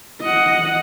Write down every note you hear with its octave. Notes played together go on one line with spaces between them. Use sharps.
D#5 F#5